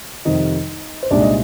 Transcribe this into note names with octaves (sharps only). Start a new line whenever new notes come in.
F2 C3 D#3 G3 D#4 D#5
C5
C2 A#2 G#3 D4 D#4 D5
D#5